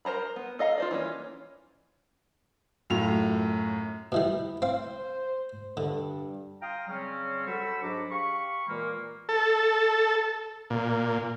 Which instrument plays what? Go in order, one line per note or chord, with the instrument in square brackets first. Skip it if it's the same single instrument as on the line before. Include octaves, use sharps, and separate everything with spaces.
[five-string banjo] A#4 C5 A#5 B5
B3
A4 D#5 F5 A#5
F4 C5 D5
E3 A#3 C#4
[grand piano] F#2 A2 F4 F7
[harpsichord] B2 E3 G3 [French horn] E4
[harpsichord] C4 F5 [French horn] C5
[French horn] G2 [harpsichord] D3
[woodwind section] F5 G5 A#5 C6 D#6 F6
C#3 F#3 G3 C4 C#4
F#4 A4 C5 B5 C#6 E6
G#2 F#3 D4 A#5 B5 D6
G4 F5 B5 C#6
A#2 E3 G#3 A#3
[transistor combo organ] A4
A#2